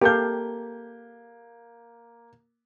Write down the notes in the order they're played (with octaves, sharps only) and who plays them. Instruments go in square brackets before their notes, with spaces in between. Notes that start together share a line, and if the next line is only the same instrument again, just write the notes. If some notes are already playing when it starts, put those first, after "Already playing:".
[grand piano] A#3 G6 [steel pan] G4 A4 F5